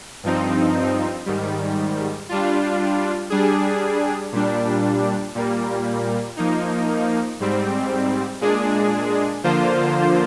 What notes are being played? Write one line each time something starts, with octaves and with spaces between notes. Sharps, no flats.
G2 F3 C4 D#4
G#2 D#3 G3
G3 D4 F4
G3 D4 G#4
A#2 G3 D4
A#2 G3 A#3
F3 A#3 D#4
G#2 G3 C4
A#2 G#3 D4 G#4
D3 F3 A#3 F4 C5